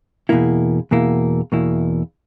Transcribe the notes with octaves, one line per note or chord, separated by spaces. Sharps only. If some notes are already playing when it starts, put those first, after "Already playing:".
E2 B2 A#3 E4
E2 B2 A#3 E4
E2 B2 A#3 E4